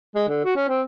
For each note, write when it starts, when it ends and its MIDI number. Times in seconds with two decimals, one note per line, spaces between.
0.15 0.24 56
0.28 0.41 50
0.44 0.54 66
0.56 0.63 61
0.68 0.82 60